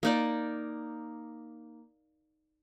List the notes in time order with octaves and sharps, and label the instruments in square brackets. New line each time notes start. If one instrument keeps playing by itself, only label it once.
[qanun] A#3 D#4 D5